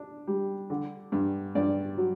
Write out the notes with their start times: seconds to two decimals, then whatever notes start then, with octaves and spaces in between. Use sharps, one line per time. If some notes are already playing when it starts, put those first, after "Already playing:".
Already playing: D4
0.27 G3
0.70 D3
1.12 G2
1.55 G2 D5
1.97 F#3